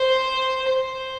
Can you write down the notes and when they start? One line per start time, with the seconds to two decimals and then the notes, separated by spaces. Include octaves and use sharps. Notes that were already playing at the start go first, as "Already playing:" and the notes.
Already playing: C5
0.67 C5